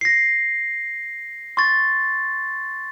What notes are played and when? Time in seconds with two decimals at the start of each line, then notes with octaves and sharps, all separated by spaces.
0.01 A#6 C7
1.57 C6 C#6 A6